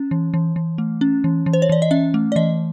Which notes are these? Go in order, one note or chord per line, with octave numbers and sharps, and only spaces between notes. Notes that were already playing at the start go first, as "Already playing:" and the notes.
Already playing: C#4
E3
E3
E3
A3
C#4
E3
E3
C5
C#5
E3 D5
D#5
C#4 E5
A3
D5
E3 D#5